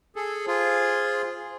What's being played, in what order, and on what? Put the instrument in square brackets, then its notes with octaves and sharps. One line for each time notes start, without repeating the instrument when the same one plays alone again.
[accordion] G#4 A4
[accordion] F4 G#4 [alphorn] C5